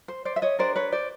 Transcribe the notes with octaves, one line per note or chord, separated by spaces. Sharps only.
C5
C5 D5
E5
C#5 D#5
D4 G4 A#4 C5 D5
B4 C#5
C5 D5